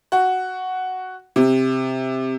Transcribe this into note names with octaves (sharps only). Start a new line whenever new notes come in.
F#4
C3